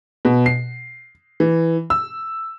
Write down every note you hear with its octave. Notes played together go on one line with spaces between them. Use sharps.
B2
C7
E3
E6